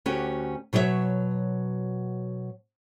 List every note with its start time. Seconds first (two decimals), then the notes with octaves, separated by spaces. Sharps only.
0.06 D2 C#4 F#4 G4
0.73 B2 F#3 C#5 D5 E5